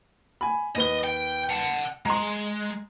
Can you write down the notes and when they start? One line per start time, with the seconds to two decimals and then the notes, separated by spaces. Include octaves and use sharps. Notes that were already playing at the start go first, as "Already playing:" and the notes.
0.41 G#5 B5
0.76 D#2 B4 D#5 G7
1.04 G5
1.50 F#5 A5
2.06 G#3 A#5 C6